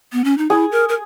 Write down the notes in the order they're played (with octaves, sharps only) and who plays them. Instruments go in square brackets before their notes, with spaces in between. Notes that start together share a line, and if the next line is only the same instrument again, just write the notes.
[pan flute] B3
C#4
D#4
[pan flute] E4 [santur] G#4
[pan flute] A#4
A#4